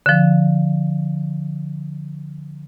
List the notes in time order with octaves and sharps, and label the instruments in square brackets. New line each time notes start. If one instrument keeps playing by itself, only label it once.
[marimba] D3 F3